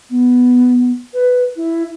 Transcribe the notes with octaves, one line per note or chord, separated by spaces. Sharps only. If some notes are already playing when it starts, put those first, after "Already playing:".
B3
B4
E4